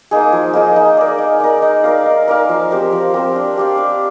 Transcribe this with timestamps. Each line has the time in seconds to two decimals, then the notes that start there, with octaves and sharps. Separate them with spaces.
0.11 A#3 D#4 G#4
0.32 F3
0.54 A#3 D#4 G#4
0.76 D#4
0.97 A#4 D5
1.19 D#4
1.40 A#4 D5
1.62 D#4
1.84 A#4 D5 F5
2.06 D#4
2.28 A#4 D5 F5
2.49 F3
2.71 C4 G4 A#4
2.93 F3
3.14 C4 G4 A#4
3.36 D4
3.57 G4 D5 F5
3.78 D4